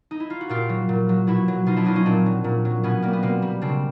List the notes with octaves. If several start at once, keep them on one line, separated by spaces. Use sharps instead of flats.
D#4
E4
F4
F#4
A#2 F4 G4
F#3
A#2
F#3
B2 E4 F#4
F#3
B2 D#4 F4
D4 E4
F#3 D#4 F4
C#4 D#4
A#2 C4 D4
F#3
A#2
F#3
B2 B3 C#4
G3 A#3
B3
B2 A#3 C4
G3
C#3 C4 D4